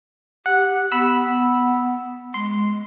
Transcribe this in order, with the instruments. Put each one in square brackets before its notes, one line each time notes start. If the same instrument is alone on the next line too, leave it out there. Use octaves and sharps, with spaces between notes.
[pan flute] G4 [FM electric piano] F#5
[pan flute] B3 [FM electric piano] B5 E6
[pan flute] G#3 [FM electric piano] C6